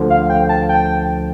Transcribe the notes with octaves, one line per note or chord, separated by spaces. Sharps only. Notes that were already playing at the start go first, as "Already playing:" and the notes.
Already playing: D2 D3 F3
F5
G5
A5
G5